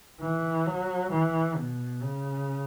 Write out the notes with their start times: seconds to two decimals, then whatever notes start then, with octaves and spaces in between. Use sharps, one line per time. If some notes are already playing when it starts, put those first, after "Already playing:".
0.20 E3
0.66 F#3
1.12 E3
1.56 B2
2.02 C#3